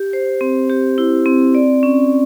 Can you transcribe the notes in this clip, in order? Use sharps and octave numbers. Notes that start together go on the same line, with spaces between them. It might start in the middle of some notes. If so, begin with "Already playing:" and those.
Already playing: G4
C5
C4
G4
E4
C4
D5
C#4